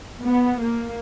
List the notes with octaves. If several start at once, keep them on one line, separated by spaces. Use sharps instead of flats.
B3
A#3